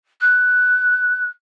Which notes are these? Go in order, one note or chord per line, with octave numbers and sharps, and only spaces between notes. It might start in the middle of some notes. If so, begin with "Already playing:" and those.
F#6